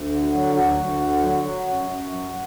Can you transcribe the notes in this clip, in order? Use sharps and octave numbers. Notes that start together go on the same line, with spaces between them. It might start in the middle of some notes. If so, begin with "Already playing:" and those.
Already playing: D2
D3
F#4
F#3
D2 F#4
D2
D3
F#3
F#3
F#2
F#2
F#3